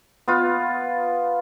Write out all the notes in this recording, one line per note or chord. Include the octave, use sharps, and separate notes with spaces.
B3 F4